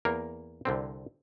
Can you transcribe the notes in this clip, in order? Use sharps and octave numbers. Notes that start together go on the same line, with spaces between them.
E2 A#3 A#4
C2 D3 C4